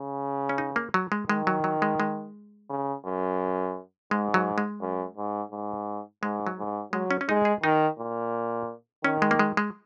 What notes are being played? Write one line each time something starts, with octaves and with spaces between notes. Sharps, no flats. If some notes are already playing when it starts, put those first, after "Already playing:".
Already playing: C#3
C#4
D#4
A#3
F#3
G#3
D#3 G#3
F#3
F#3
G#3
G#3
C#3
F#2
G#2 G#3
F#3
G#3
F#2
G#2
G#2
G#2 G#3
F#3
G#2
F#3 G#3
C#4
C#4
G#3 D#4
G#4
D#3 D#4
A#2
D#3 C#4
G#3
A#3
G#3
G#3